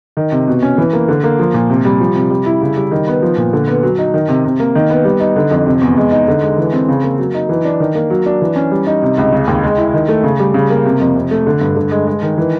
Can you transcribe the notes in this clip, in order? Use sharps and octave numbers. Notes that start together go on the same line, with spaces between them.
D#3
C3
B2
C#4
E3
A#3
D3
A#3
F3
A#2
C3
G3
F3
C3
G3
E4
C#3
G3
D#3
B3
F3
A#2
D3
B3
F#3
D#4
D#3
C3
C3
A#3
D#3
B3
G3
D#4
D3
F2
C3
E2
G#3
D#4
D3
G#3
E3
C4
C#3
A#3
F#3
D#4
E3
D4
D#3
A#3
F#3
D4
E3
C#4
G3
D#4
C3
C#2
C#3
D#2
G#3
E4
D#3
A3
C#3
G3
C#3
A#3
C3
F2
C3
A3
D3
G2
D3
G#3
G#3
D#3
E3